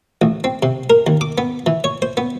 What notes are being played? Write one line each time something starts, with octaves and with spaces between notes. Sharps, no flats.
A1
C4
C3
A#4
D#2
D6
B3
E3
C#5
C5
B3